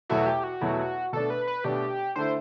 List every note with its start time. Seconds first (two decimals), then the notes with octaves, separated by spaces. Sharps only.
0.10 E2 B2 F#3 A3 E4 F#4
0.26 G4
0.44 F#4
0.61 E2 B2 F#3 A3 E4
1.13 B2 A3 D4 A4
1.30 B4
1.48 B4
1.64 B2 A3 D4 G4
2.16 D3 A3 E4 C5